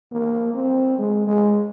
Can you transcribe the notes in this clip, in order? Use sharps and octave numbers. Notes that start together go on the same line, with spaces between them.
A#3
C4
G#3
G#3